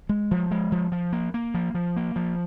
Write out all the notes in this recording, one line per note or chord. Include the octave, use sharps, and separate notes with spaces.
G#3
F3
G#3
F3
F3
A#3
A#3
F3
F3
A#3
F3